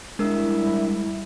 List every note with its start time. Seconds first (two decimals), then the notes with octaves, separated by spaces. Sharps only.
0.19 G3 G#3 D4 E4 A#4 E6